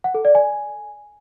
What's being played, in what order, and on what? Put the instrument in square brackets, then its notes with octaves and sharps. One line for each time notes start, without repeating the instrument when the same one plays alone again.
[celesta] F#5
A4
D5
G#5